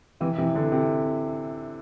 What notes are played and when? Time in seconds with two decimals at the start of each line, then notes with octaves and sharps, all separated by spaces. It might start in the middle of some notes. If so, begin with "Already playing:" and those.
0.20 C3 E3
0.38 C3 E3
0.55 D3
0.72 C3